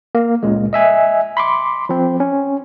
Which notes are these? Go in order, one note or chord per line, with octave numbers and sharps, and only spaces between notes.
A#3
C#2 A#2 C#3 G#3
D#5 E5 G#5
B5 C6 D6
F3 C4
C#4